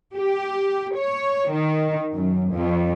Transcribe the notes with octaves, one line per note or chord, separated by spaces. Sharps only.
G4
C#5
D#3
F#2
F2